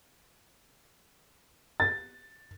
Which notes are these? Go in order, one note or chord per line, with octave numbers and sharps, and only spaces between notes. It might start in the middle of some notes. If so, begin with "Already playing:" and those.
A6